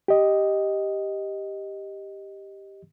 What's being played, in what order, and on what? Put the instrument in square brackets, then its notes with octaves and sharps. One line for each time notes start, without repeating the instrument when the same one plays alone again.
[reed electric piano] G4 D#5